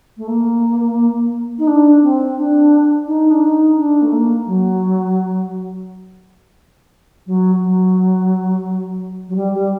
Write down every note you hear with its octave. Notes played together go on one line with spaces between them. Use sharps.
A3
A#3
D#4
D4
C4
D4
D#4
D4
D#4
D4
A3
A#3
F#3
F#3
F#3
F#3
G3
G3